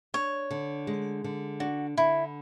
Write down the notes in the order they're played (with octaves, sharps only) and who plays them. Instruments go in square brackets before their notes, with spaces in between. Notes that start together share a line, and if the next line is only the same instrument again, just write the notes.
[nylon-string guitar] D4 [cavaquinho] C#5
[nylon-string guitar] D3
G#3
D3
[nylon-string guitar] D4 [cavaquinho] F#4
[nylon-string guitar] D3 [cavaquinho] E4